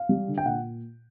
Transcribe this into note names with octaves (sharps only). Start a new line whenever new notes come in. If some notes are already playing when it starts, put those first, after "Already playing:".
Already playing: F5
G3
D3
G5
A#2 F#5